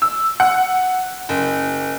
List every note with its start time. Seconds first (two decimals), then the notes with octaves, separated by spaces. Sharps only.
0.02 E6
0.40 F#5
1.29 F#1